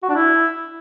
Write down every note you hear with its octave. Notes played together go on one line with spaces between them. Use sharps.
F#4
D4
E4